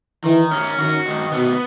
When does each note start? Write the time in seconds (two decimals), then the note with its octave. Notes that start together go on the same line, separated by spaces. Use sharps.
0.24 D#3 E3
0.51 C#4
0.78 D#3 F#4
1.06 D#3
1.32 B2 B3